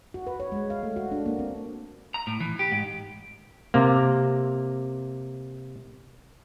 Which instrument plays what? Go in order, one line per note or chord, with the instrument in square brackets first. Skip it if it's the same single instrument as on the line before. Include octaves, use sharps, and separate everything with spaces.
[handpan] F#4
B4
C#5
G#3
F5
A3
F#4
D4
A#3
C4
[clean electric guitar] A#5
A2
E3
G4
G#2
[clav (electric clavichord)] C3 A#3